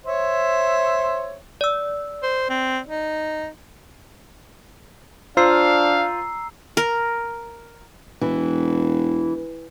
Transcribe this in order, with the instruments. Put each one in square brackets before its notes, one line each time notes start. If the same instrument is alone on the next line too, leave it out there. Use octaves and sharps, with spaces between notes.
[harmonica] C5 C#5 E5
[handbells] D5 E6
[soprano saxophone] C5
C4
D#4
[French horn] D4 [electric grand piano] F4 C5 [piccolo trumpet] F5 [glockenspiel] A#5 E6 C7
[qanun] A#4
[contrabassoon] E1 [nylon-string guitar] E3